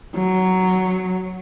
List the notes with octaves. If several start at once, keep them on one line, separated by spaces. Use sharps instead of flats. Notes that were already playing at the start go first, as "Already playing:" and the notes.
F#3